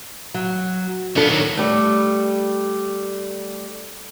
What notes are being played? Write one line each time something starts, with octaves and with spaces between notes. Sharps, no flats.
F#3
F3 B3 D4 A4
A2 D#3 F#3
G3 A3